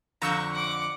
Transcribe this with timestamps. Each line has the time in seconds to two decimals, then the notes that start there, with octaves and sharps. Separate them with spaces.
0.22 F2 D3 A#5 C#6 E6 G6
0.53 F#5 D6